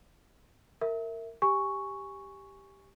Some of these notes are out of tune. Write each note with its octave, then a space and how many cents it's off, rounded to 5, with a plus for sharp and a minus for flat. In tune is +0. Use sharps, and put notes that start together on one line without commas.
A#4 -25 E5 -5
G4 +0 G#5 +0 C#6 +0